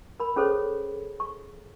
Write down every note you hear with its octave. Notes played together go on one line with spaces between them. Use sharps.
A#4 B5
C#4 G#4 A4 C5 C#5
C#6